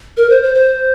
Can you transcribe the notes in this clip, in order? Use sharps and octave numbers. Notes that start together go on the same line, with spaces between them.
A#4
C5
C5
C5